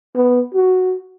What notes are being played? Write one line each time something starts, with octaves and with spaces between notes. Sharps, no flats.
B3
F#4